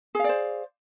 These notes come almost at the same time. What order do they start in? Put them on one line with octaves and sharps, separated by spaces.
G#4 F5 D5 C5